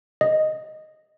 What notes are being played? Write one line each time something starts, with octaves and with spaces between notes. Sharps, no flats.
D#5